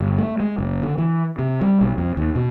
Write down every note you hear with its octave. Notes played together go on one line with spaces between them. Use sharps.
G1
A3
G#3
F#1
D3
E3
C3
G3
B1
F2
D#2
B2